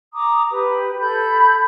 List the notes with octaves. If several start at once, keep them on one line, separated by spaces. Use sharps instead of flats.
A#5 D6 D#6
G4 B4
A4 B5 G6